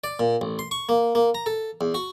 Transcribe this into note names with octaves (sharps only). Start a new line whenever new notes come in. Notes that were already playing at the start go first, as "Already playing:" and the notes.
D5
A#2
A1
C6
C#6
A#3
A#3
A#5
A4
E2
F#4